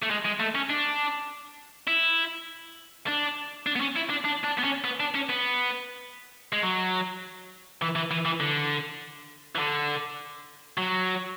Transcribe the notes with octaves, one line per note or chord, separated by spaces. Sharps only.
A3
G#3
G#3
A3
C#4
D4
E4
D4
D4
B3
C#4
E4
D4
D4
D4
B3
C#4
B3
D4
C#4
B3
G#3
F#3
E3
E3
E3
E3
D3
E3
D3
F#3